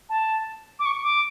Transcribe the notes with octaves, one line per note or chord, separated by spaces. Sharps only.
A5
D6
C#6
D6